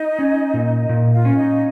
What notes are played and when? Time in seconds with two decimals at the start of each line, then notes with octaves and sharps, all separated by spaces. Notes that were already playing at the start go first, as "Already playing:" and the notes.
Already playing: D#4 D#5
0.19 C#4
0.54 A#2
0.89 A#2
1.12 F4 F5
1.25 C#4
1.36 D#4 D#5